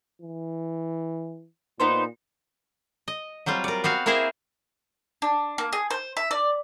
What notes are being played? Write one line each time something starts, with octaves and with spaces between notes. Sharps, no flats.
E3
A#2 B3 D#4 C5
D#5
F#3 G3 C4 F4
A#4 D5
B3 C4 F#4 F5
A#3 C4 E4 G#4 A#4 C5
D4
A#3
G#4
C5
E5
D5